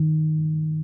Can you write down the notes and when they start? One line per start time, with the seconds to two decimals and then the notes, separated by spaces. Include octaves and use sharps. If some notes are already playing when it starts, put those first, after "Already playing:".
Already playing: D#3